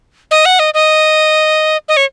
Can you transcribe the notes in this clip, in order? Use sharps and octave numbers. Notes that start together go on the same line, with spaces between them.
D#5
F#5
D#5
D#5
D#5
C#5